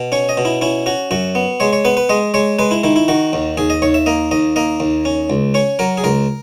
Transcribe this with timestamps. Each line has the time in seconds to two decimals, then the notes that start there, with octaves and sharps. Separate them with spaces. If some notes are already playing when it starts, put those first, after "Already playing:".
Already playing: B2
0.12 C#4 C#5
0.29 D#5
0.37 B2
0.45 E4
0.61 C#4 E4
0.86 C#4 F#4
1.11 F#2 F#4
1.35 B3
1.60 G#3 C#5
1.73 C#5
1.85 B3 B4
1.97 B4
2.09 G#3 D#5
2.34 G#3 C#5
2.59 G#3 B4
2.71 E4
2.84 D#3 E4
2.96 E4
3.08 D#3 F#4
3.33 D#2
3.57 D#2 G#4
3.70 D#5
3.82 D#2 C#5
3.94 E5
4.06 A#3 D#5
4.31 D#2 D#5
4.56 A#3 D#5
4.80 D#2
5.05 C#4
5.30 C#2
5.54 C#4 C#5
5.79 F#3 A#4
5.98 G#4
6.04 C#2 A#4